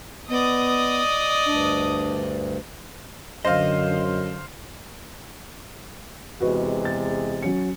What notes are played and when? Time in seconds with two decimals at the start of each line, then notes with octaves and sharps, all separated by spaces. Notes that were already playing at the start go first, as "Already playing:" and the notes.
0.29 B3 D5 D#5 D#6
1.46 D2 G2 D4
3.45 F#2 D3 C5 D#5 F5
6.40 E2 C3 G#3 F#4 B4 D#5
6.85 A6
7.43 F#3 C#4 C#7